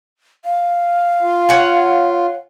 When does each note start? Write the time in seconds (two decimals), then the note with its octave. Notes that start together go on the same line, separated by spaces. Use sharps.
0.45 F5
1.22 F4
1.49 C#5 F#5 G#5